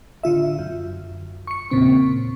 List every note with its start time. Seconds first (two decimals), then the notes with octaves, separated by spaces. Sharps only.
0.23 A1 D3 F4 E5
0.59 F#2
1.47 C#6 C#7
1.71 E2 A#2 C#3 C4 C#6